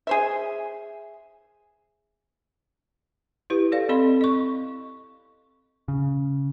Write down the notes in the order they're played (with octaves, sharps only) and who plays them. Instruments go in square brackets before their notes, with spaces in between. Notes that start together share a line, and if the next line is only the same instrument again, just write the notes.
[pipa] G#4 C5 E5
[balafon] E4 G4 B4
A4 D5 F5
C4 A4 D#5 B5 C6
D#5 C#6
[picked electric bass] C#3